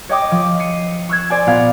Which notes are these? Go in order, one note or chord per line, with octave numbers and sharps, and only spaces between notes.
C#5 D#5 G5 D6 D#6
F3
C7 C#7 D#7
C#6 E6 F#6 G#6
C5 D5 G#5
A#2 B3 F5 G#6